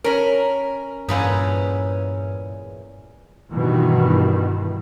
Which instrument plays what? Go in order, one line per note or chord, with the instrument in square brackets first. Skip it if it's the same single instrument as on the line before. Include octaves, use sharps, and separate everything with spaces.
[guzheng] C#4 B5 [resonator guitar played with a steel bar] A#4
[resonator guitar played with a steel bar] E2 A#2 C#4 [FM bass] G2 [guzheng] E4 G#4 B4
[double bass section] G2 B2 D#3 E3